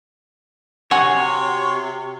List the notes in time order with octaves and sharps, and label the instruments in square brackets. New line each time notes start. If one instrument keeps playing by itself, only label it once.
[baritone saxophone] C3 [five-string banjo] F#4 F#5 G#5 [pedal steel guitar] C#5